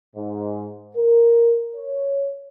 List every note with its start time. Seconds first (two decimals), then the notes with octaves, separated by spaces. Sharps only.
0.16 G#2
0.96 A#4
1.76 C#5